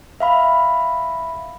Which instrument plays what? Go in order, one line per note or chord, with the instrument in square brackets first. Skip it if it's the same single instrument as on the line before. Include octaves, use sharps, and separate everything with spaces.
[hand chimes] E5 F5 B5